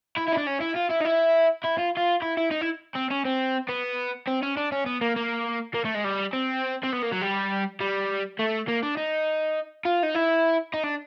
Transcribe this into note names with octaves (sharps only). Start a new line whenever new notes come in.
E4
E4
D#4
D4
C#4
E4
F4
E4
D#4
E4
E4
F4
F4
E4
E4
D#4
E4
C4
C#4
C4
B3
C4
C#4
D4
C#4
B3
A#3
A#3
A#3
A3
G#3
G3
C4
C4
B3
A#3
F#3
G3
G3
A3
A#3
D4
D#4
F4
D#4
E4
D#4
D4